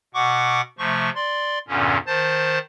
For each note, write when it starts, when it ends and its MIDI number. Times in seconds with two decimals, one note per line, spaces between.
0.14 0.61 47
0.14 0.61 78
0.14 0.61 85
0.14 0.61 86
0.79 1.10 48
0.79 1.10 53
0.79 1.10 57
0.79 1.10 85
1.15 1.58 74
1.15 1.58 84
1.68 1.97 40
1.68 1.97 43
1.68 1.97 46
1.68 1.97 50
1.68 1.97 61
2.07 2.59 51
2.07 2.59 72
2.07 2.59 81
2.07 2.59 93